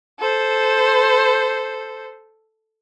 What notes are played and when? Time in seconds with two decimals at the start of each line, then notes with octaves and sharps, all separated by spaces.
0.20 A4 C5